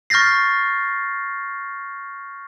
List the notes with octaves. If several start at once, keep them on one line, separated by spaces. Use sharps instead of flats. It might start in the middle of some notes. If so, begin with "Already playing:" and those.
C#6 F6 G6 A6 A#6 C7